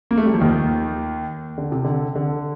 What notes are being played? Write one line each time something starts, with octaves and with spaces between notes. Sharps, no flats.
A#3
A3
G3
F3
D#2 D#3
D3
C3
D3
D3